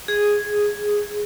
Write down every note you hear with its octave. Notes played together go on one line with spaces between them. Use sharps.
G#4